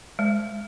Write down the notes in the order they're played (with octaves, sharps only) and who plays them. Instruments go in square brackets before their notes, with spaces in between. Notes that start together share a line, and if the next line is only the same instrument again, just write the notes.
[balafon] G#3